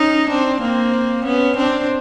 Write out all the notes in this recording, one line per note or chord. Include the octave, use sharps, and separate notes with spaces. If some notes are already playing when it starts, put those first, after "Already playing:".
Already playing: C#4 D#4
C4 D4
A#3 C4
B3 C#4
C4 D4